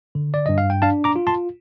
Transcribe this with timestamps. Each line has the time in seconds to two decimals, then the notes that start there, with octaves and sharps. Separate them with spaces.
0.15 D3
0.34 D5
0.46 G2 D#5
0.58 F5
0.70 G5
0.82 D4 F5 A5
1.04 A#5 D6
1.16 F4
1.27 A5 C6